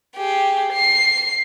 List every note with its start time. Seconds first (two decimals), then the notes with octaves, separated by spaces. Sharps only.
0.16 G4 G#4
0.73 C7